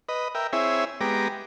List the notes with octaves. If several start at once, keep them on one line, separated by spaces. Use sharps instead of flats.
B4 D#5
A#4 E5 G5
C4 E4 G#4 C#5 E5
G#3 B3 G4 A#5 D6